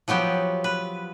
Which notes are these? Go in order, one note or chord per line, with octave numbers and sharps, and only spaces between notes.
F3 F#3 B3 G4
B4